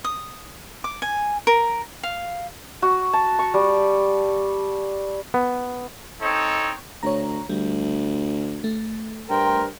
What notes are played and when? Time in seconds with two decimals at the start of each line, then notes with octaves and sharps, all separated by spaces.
0.04 D#6
0.84 D6
1.02 G#5
1.47 A#4
2.03 F5
2.82 F#4
3.13 A5
3.39 C#6
3.54 G3
5.34 B3
6.22 C4 D#4 A4 C#5
7.03 D2 C#5 A#5
7.49 D2 G3
8.64 A3
9.30 G2 A#4 C5 G5